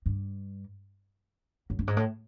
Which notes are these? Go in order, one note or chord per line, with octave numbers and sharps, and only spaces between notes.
G2
F#2
G2
G#2
A2